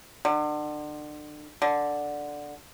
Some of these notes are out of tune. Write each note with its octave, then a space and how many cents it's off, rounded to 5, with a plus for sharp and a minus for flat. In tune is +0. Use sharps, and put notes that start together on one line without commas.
D3 +35
D3 +0